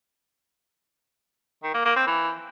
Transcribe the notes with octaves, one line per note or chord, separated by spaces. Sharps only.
D#3
A#3
A#3
C4
E3